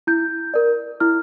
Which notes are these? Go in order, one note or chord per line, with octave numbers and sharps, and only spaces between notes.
E4 G6
A#4 D5
E4 F6